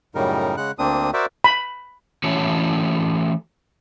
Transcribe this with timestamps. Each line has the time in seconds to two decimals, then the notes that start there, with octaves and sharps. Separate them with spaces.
0.15 F#2 A2 C#3 G3 D#4 A#4
0.57 C#3 G#3 F#5 F#6
0.79 D2 A#3 C4 D4 D#6
1.14 F#4 A#4 C5 D5 E5
1.44 B5
2.24 E3 A3 C#4 F#4 A4 C#5